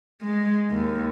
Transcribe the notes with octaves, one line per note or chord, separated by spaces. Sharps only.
G#3
D#2